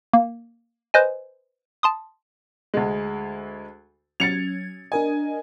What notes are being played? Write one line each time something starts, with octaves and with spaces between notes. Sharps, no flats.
A#3
B4 C5 D#5 G#5
A5 C6 D#6
D2 G#3
F#3 C#4 G#6 A6 C#7 F7
D4 A#4 D#5 G#5